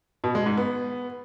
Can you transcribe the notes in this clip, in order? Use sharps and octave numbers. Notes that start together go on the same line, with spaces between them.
B2
G#3
G#2
B3